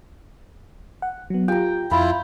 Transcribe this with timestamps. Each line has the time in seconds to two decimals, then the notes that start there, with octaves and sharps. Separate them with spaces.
1.02 F#5
1.30 F#3 B3
1.48 F4 G4 G5 A#5
1.91 F2 E4 F4 B5